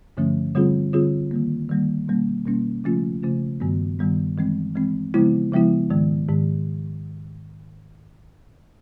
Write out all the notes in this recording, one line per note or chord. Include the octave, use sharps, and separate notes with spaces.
G2 D3 F3 A3 C#4
D3 G3 C4 F4 G#4
D3 G3 C4 F4 G#4
D#3 G3 A#3
D#3 G3 A#3
B2 G3 A#3 C#4
B2 G3 A#3 C#4
C#3 F3 A3 C#4 F4
C#3 F3 A3 C#4 F4
G2 D#3 G3 B3
G2 D#3 G3 B3
E3 G#3 C4
E3 G#3 C4
C#3 F3 G#3 B3 E4
C#3 F3 G#3 B3 E4
G#2 D#3 G#3
G#2 D#3 G#3